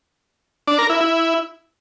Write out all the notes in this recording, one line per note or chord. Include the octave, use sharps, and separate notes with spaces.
D4
A#4
E4
E4